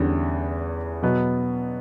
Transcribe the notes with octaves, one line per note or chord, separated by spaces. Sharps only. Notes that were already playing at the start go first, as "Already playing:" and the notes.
Already playing: E2 D3 G3 C#4
B2 F#3 B3